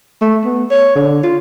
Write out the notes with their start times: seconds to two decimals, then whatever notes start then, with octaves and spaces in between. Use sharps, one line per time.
0.21 A3
0.45 B3
0.70 C#5
0.95 D3
1.23 F4